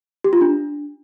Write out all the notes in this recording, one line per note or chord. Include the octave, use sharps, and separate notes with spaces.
G4
F4
D4